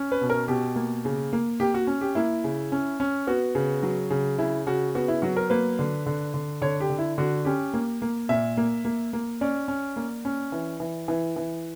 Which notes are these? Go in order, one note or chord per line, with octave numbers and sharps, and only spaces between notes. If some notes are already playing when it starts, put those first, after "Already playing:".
Already playing: C#4
B4
B2
A#4
B2 G4
A#3
C#3
A#3
A#3 G4
F#4
C#4
G4
A#3 E4
C#3
C#4
C#4
B3 F#4
C#3
F#3
C#3
C#3 E4
C#3 F#4
B3 F#4
E4
F#3 F#4
A#4
A#3 B4
D3
D3
D3
D3 C#5
G4
D3
E4
D3 F#4
C#4 G4
A#3
A#3
A#2 E5
A#3
A#3
A#3
C#4 D5
C#4
A#3
C#4
E3
E3
E3
E3